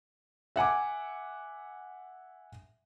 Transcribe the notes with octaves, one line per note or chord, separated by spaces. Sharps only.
E5 F#5 G#5 D6